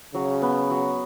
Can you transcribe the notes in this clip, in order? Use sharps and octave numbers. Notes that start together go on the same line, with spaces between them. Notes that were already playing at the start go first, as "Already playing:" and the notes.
C#3 F#3
B3
F#3